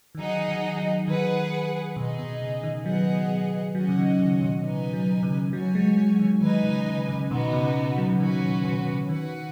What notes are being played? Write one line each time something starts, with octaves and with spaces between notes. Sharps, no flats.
D#3
F#3 D#4 G#4 D#5 F#5
D#3
F#3
D#3 G#4 B4 F#5
B2 D#4 G#4 D#5
B2
C#3
D#3
F#3 B3 G#4 D#5 F#5
F#3 C#4 F#4 D#5 F#5
C#3
D#3
C#3
B2
C#3 D#4 B4 G#5
F#3
C#3
F#3 F#4 C#5 G#5
G#3
F#3
D#3
D#3 D#4 B4 G#5
C#3
C#3
C#3
B2 B3 D#4 F#4
C#3
F#3
C#3
D#3 C#4 F#4 B4
B2
B2
C#3
D#3 F#4 B4 F#5